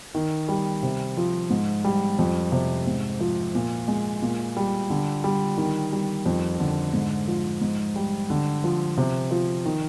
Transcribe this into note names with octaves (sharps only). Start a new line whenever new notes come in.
D#3
G3
C3
F3
G#2
G3
F2
C3
G#2
F3
A#2
G#3
A#2
G3
D3
G3
D#3
G3
F2
D3
G#2
F3
G#2
G3
D3
F3
C3
F3
D#3